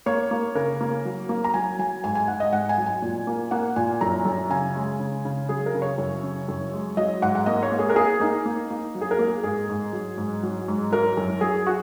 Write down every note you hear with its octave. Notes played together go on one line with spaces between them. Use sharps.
A#3 C#5
A#3
C#3 A#4
A#3
F#3
A#3
A#5
F#3 G#5
F#3 G#5
G#2 G#5
G#5
G#2 F#5
D#5
G#2 F#5
G#5
F#3
G#5
A#2
A#3
A#3 F#5
A#2 G#5
F#2 A#5
F#2
C#3 G#5
G#3
C#3
C#3
F#3 G#4
A#4
C#3
C#5
F#2
C#3
F#2
G#3
F#3 D#5
G#2 F#5
F#5
A#3 D#5
C#5
A#3
G#4
A#4
A#3 G#4
A#3 D#4
A#3
A#3
F#3
G#4
A#4
A#3
G#4
G#2 G#4
G#2
F#3
G#2
F#3
G#2
F#3 A#4
F#2
F#3 G#4
F#4